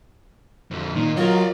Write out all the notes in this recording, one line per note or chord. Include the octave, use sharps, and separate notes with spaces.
F2 D3
A#2 D#3
F#3 F4 A#4 C#5 D#5